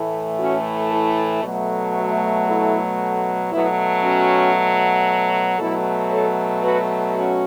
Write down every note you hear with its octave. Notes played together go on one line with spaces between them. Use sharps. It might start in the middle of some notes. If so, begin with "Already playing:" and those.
Already playing: A2 E3 A3
C#4 F#4
E4 A4
B2 F#3 A3
F#4 B4
E4 A4
B2 F#3 A3 B3 E4
C#4 F#4
B2 F#3 A3 E4 A4
A4 C#5
F#4 B4
C#4 F#4